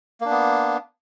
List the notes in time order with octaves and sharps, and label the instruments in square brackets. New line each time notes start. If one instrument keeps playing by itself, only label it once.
[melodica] A#3
D4
B3